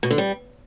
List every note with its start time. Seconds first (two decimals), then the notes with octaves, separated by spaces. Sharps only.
0.03 B2
0.11 D3
0.18 G3